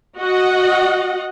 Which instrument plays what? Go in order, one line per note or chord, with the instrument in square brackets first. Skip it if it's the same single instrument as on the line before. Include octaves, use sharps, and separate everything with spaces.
[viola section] F#4 D#5 F#5